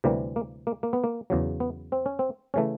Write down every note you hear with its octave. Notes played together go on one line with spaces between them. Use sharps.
D2 C3 E3 G3 A#3
A#3
A#3
A#3
B3
A#3
E2 C#3 F#3
B3
C4
C#4
C4
C#3 E3 A3 C#4